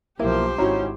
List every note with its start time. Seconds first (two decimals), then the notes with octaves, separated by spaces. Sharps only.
0.19 B1 F3 A#3 E4 G4 C5
0.58 G#1 C#4 D#4 E4 F#4 A#5